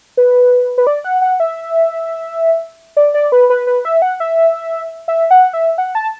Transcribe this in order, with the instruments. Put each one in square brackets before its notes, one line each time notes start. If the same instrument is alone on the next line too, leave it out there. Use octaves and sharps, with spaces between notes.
[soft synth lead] B4
B4
D5
F#5
F#5
E5
D5
D5
B4
B4
B4
E5
F#5
E5
E5
F#5
E5
F#5
A5